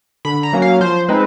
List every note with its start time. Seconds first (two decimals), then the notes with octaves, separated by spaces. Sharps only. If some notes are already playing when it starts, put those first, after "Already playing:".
0.25 D3 B5
0.43 A#5
0.53 F#3 A#3 C#4
0.62 F5
0.80 F3 C5
1.09 G#3 C4 D#4 B4